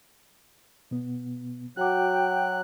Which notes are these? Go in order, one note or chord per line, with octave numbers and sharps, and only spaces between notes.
B2 B3
F#3 F#4 F#5 G5 D6 F#6